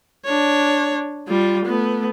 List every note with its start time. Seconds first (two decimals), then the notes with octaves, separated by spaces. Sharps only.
0.25 D4 C#5
1.28 G3 F4
1.65 A3 B3